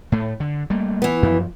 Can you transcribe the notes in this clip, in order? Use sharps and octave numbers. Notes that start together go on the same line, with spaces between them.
A2 A3
D3
G3 A3 A#3
E3 B3
F#2 F3